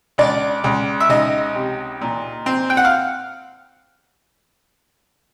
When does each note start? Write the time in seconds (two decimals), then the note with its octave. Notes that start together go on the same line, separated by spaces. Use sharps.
0.18 C#2 D4 D5
0.64 C#2
1.00 E5
1.09 C#2 D#4 D#5
1.55 C3
2.01 A#2
2.46 C4
2.70 G5
2.77 F#5
2.85 F5